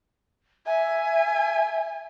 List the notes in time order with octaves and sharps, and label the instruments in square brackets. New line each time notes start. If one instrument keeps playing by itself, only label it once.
[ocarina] E5 [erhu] G#5